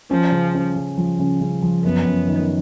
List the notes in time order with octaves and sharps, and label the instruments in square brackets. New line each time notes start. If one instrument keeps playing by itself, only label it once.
[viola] F3 [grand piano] C#4
[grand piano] C#3
C#4
C#3
F3
C#3
C#3
F3
[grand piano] F#2 [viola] B3
[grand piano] F#2
D#3